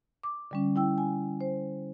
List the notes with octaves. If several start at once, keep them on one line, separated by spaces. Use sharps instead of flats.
D6
D3 G3 C#4
E4 G5 E6
G#5
C5